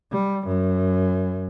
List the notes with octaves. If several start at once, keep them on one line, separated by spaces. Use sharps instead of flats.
G3
F#2